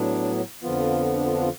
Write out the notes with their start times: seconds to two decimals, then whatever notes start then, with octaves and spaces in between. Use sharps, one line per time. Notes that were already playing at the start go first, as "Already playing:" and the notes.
Already playing: A2 F#3 B3 D4
0.62 F2 D3 F3 B3 F4
1.16 D4
1.25 F4
1.33 D4
1.41 F4